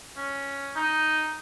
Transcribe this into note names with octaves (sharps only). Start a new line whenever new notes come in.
C#4
D#4